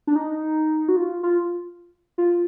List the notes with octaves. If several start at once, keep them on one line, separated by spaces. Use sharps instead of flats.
D4
D#4
F#4
F4
F4
F4